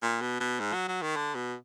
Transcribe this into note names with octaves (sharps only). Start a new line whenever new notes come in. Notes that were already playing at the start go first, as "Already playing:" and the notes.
A#2
B2
B2
G#2
F#3
F#3
D#3
D3
B2